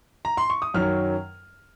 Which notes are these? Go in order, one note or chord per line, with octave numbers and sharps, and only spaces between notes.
A#5
C6
C#6
D#6
F#2 D#3 F#3 C#4 F6